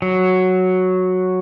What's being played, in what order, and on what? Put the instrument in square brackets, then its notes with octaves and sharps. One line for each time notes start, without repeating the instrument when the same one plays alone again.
[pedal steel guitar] F#3